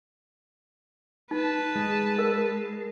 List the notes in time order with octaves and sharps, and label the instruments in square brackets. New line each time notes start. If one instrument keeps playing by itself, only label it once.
[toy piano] D#4 [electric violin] B4 A5
[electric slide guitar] G#3
[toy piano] A#4